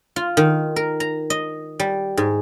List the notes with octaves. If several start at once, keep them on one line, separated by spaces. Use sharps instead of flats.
F4
D#3
A#4
A#5
D#5
G3
G#2